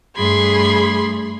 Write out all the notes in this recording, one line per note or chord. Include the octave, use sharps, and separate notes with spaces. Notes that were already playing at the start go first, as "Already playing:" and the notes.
G2 A3 G#4 B5 C6 G#6